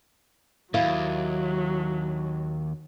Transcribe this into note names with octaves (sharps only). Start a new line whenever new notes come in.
D#2 F#3 E4 F5